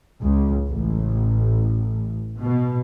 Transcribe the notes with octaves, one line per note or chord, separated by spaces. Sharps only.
C#2
A1
B2